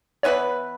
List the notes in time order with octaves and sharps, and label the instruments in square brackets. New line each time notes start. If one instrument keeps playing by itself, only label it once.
[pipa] E3 B3 E4 B4 [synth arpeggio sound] C#5